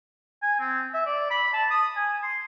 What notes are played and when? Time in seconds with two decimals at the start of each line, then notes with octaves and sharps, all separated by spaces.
0.42 G#5
0.60 C4
0.94 E5
1.06 D5
1.30 B5
1.53 A5
1.71 D#6
1.96 G#5
2.23 C6